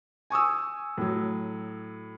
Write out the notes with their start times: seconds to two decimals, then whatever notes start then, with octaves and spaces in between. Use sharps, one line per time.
0.30 G#5 C#6 D#6 E6
0.98 A2 F#3